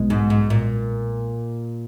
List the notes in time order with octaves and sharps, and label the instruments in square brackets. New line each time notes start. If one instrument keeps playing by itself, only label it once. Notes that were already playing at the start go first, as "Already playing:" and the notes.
Already playing: [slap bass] B1 B2 G#3
[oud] G#2
G#2
A#2